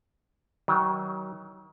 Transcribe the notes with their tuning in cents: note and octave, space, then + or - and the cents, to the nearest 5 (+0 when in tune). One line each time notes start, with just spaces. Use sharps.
D#3 +35 F#3 +35